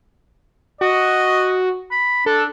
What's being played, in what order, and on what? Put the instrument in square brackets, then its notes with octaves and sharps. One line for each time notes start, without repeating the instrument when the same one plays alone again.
[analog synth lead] F#4 [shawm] D#5
[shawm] B5
[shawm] D4 [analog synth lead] A4